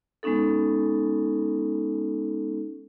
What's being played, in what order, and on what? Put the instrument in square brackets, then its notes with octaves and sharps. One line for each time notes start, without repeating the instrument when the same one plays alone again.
[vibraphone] G#3 B3 C#4 D#4 A4